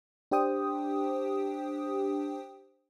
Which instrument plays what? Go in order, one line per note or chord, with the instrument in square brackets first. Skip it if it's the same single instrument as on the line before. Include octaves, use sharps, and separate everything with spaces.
[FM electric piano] D4 G4 C5 G5 D#6